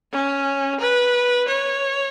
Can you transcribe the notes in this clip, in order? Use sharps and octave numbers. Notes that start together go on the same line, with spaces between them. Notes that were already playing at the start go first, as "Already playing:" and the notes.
C#4
B4
C#5